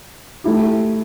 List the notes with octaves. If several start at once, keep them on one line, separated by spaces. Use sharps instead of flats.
A3 E4 G4